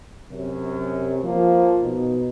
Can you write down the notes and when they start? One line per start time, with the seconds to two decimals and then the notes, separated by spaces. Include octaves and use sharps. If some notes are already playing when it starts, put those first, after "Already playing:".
0.32 F#2 C3
1.23 F3 A#3
1.82 B2 D#4